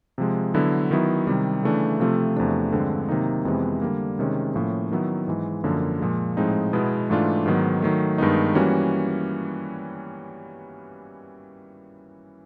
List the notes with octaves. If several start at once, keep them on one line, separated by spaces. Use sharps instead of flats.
C3 F3 G#3
D3 F#3 B3 E4
D#3 F#3 B3 E4
C3 D#3 G3
C#3 E3 A3 D4
C3 F3 A3 C4 F4
E2 C3 F3 A3 D4
G2 D3 F3 G#3 C4
C3 D#3 F#3 A#3 D#4
F2 C3 E3 G#3 B3
D3 G3 A#3
C3 D#3 G#3 C#4
A2 F3 A#3 C#4
D#3 F#3 B3 E4
G#2 E3 G#3
F#2 D3 F3 A#3
A#2 F3 G#3
A2 F3 G#3 C4 D#4
B2 G#3 B3 E4
G#2 E3 A3 D4 F4
G#2 D#3 F#3 B3
D#3 F#3 A3
G2 D#3 G#3 B3 D#4
E3 G3 A#3 C#4 F#4